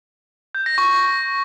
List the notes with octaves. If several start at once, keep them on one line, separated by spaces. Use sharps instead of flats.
G6
A#6
C#6